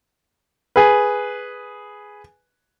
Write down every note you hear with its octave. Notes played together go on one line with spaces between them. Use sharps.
G#4 B4